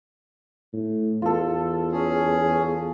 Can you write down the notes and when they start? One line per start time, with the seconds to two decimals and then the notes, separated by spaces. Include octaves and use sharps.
0.73 A2
1.22 E2 F4 A4
1.92 C#4 G#4